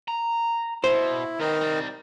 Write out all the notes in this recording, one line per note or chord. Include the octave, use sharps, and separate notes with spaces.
A#5
B2 E4 C5
D#3 B3 C4 D#4 A#4
G3 C4